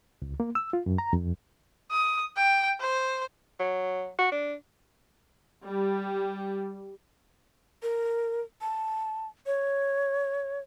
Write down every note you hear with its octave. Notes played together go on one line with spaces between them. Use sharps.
C#2
A#3
E6
F4
F#2
A#5
F2
D#6
G5
C5
F#3
F#4
D4
G3
A#4
A5
C#5